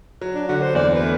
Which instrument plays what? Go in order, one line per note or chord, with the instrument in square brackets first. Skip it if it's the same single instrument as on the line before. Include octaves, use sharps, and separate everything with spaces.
[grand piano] F#3
[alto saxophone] D4
[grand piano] D3 [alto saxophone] F#4
[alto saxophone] C5
[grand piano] E2 [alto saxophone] D5
[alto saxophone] B4
[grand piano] A3